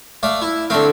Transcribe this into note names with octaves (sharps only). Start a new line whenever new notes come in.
A3 D5 F5
E4
D3 A3 C4 F5